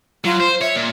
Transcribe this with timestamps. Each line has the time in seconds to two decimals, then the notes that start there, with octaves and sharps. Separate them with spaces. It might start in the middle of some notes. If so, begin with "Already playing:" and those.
0.24 F#3 F4
0.40 C5
0.61 C#5 E5
0.75 A#2